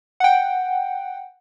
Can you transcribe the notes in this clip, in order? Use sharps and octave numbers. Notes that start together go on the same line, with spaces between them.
F#5 G5